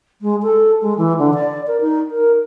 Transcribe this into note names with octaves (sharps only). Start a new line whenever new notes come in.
G#3
A4
G#3
E3
D3
D5
A#4
D#4
A#4